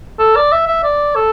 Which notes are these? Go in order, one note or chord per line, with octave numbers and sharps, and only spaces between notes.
A4
D5
E5
E5
D5
A4